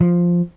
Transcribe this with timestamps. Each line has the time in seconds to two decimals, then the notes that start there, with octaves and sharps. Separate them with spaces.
0.01 F3